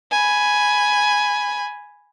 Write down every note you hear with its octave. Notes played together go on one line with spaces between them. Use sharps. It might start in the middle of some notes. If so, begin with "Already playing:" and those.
G#5 B5